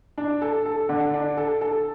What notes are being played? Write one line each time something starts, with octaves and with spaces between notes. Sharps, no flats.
D4
A4
A4
D3
D4
A4
A4